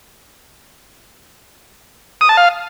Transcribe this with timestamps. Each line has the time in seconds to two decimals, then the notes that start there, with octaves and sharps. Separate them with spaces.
2.21 D#6
2.29 A5
2.37 F5